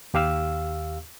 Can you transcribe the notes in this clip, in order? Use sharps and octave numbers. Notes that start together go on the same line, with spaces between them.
D#2 G4 F5 E6